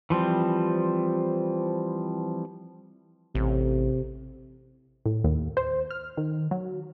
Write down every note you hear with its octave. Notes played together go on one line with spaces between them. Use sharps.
E3 F3 G3 C4
A1 C3
A2
D#2
C5
F6
D#3
F#3